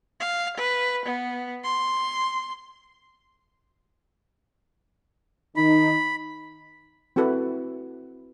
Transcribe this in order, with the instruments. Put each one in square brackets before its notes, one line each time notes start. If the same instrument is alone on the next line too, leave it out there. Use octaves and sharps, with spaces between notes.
[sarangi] F5
B4
B3
C6
[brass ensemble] D#3 D#4 [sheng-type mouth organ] B5
[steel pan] C4 E4 F#4 A4 B4